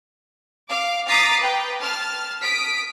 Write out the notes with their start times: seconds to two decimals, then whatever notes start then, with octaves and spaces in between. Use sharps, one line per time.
0.69 F5 D6
1.08 A#5 D6 D#6 A6 B6 C7
1.40 B4 G5
1.80 A5 F6
2.42 D#6 B6 D7